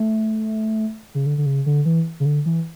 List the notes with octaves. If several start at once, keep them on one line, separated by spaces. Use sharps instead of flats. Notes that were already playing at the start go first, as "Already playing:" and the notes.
Already playing: A3
C#3
D3
D3
C#3
D3
E3
C#3
D3
E3